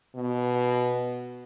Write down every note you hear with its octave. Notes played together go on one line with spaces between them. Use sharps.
B2